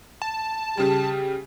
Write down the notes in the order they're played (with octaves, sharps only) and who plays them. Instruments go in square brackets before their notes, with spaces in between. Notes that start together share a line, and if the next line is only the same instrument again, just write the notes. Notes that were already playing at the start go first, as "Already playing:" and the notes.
[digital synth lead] A5
[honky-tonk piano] C#3 G3 [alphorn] G4